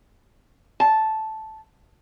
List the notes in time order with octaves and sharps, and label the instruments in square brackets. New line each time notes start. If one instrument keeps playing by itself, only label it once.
[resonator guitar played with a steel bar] A5